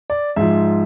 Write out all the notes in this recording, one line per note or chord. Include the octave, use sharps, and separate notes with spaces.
D5
G#2 F3 E5